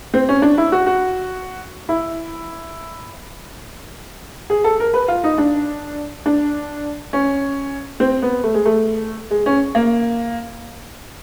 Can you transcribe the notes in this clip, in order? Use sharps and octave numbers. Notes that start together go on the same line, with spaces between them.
C4
C#4
D4
E4
F#4
F#4
E4
G#4
A4
A#4
B4
F4
D#4
D4
D4
C#4
C4
B3
A3
G#3
A3
G#3
C#4
A#3